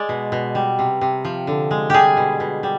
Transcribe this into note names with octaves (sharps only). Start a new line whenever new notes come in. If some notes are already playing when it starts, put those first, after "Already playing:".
Already playing: G#3 D5
B2
B2
G3
C3
C3
F3
D3
G#3
G3 G4 G#4
B2
B2
G3